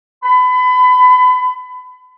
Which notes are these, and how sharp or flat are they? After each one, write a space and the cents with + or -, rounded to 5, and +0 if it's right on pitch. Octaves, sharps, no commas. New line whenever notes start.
B5 +30